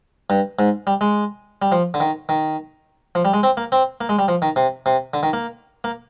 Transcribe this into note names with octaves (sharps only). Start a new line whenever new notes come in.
G2
G#2
G3
G#3
G3
F3
D3
D#3
D#3
F3
G3
G#3
C4
A#3
C4
A#3
G#3
G3
F3
D#3
C3
C3
D3
D#3
A#3
A#3